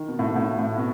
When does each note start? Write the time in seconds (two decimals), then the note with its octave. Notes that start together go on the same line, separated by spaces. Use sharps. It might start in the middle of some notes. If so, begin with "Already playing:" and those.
Already playing: D#3
0.08 B2
0.19 A2
0.36 A2
0.58 A2
0.78 B2